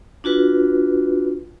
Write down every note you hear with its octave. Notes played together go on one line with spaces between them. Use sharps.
D4 F4 F#4 B4